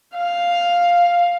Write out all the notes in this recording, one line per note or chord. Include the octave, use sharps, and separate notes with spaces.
F5